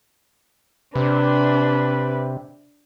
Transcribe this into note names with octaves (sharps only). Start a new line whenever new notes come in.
C3 D4 B4